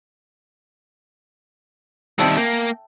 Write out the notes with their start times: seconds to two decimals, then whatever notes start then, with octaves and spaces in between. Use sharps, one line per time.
2.19 D#3 G3 C4 D4 E4
2.37 A#3 G5